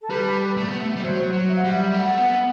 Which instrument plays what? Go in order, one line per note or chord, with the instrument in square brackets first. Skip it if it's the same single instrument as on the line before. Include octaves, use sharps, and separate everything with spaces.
[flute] A4
[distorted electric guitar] G3 [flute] B4
[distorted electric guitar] A3
B3
A3
G3
[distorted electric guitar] F#3 [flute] C5
[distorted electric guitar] F#3
[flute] E5
F#5
[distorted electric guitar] G3 [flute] E5
[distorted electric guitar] A3 [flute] F#5
[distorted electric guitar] B3